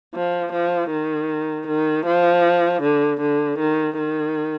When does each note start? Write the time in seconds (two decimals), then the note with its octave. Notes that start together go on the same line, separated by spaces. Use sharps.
0.15 F3
0.53 F3
0.91 D#3
1.68 D#3
2.06 F3
2.83 D3
3.21 D3
3.59 D#3
3.98 D#3